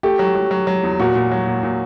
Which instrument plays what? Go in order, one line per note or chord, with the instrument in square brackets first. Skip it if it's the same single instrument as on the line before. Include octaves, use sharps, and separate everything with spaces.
[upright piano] A3 [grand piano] G4
[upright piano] F#3
F#3
F#3
F#3
E2
[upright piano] A#2 [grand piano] F#4
[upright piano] A#2
F#3
A#2
A#2